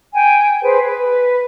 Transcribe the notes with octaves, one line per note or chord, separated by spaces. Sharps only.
G5 G#5
G#4 B4 C5
B4